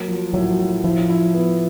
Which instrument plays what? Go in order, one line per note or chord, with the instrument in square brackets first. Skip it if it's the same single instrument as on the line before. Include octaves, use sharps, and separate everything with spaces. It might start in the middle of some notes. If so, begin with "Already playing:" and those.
Already playing: [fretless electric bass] F#3 [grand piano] A#3
[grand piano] F3
[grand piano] A2 [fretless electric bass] F#3
[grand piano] A2
[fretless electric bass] F3 [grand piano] E4
[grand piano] E4
B3